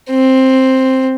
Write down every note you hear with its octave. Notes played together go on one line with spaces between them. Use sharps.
C4